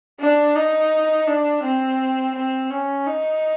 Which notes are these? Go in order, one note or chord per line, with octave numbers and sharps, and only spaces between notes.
D4
D#4
D4
C4
C4
C#4
D#4